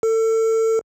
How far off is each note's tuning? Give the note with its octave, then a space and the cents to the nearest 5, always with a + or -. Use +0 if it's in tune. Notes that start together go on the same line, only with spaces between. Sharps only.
A4 +30